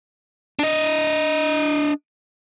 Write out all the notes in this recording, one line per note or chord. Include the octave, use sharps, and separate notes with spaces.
D4 D#5